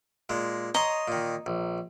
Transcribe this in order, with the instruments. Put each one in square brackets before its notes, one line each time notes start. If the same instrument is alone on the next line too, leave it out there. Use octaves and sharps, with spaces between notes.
[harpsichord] A#2 G#3
[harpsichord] C#5 C6 [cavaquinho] D#5 A#5
[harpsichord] A#2 D#3
A#1